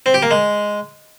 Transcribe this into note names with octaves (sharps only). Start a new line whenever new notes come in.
C4
G4
A#3
G#3